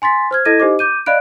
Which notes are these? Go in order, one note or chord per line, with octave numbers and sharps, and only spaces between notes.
G#5 C6 A6 B6
C5 F6 G#6
E4 A4 D#5 G#6 A#6 D#7
D#4 G4 C5 D#5 D6
D6 G6 D#7
D5 D#5 F5 B5 F#6 D7